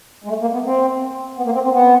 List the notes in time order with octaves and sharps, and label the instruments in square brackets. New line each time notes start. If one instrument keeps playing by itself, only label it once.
[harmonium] G#3
A3
A#3
B3
C4
B3
A#3
C4
C4
B3